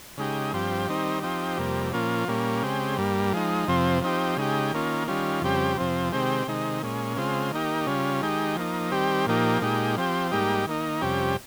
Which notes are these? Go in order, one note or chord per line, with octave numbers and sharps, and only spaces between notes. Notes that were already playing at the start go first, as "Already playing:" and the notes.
C#3 G#3 D#4 G4
G2 F3 C4 G4
D#3 G3 C4 D#4
F3 C4 D#4 G4
F2 C3 G3 A#3
A#2 F3 A#3 C#4 F4
A#2 G3 A#3 C#4
C#3 G#3 C4 G4
G2 G3 A#3
F3 G#3 D#4
F2 C3 F3 C4
F3 C4 D#4 G4
C#3 G#3 D#4 G4
D#3 A#3 C#4 F4
D#3 G3 C#4 F4
F2 C#3 G3 C4 G4
F2 C3 F3 C4
C3 D#3 G#3 C4 G4
C3 D#3 G#3 D#4
A#2 G#3 C#4
C#3 G#3 C4 F4
D#3 A#3 D#4 G4
C#3 G3 C#4 F4
D#3 G#3 D#4 G4
F3 A#3 D#4
D#3 G3 C4 G4
A#2 F3 A#3 D#4 G4
A#2 G#3 D#4 G4
F3 C4 G4
G#2 G3 A#3 D#4 G4
D#3 A#3 D#4
F2 C3 G3 C#4 G4